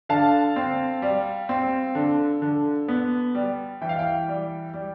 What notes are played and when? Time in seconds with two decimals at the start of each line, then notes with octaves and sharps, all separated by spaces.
0.09 D3 F5 A5
0.56 C4
1.02 G3
1.49 C4
1.95 D3
2.42 D3
2.88 B3
3.35 G3
3.81 E3 G5
3.89 F5
3.99 G5
4.28 G3
4.74 G3